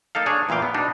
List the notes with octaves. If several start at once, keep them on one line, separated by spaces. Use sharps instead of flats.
A#3 D#4 A4 F5
D4 G#4 C#5
E2 A#2 E3 F5 G5
B3
B2 D4 D#4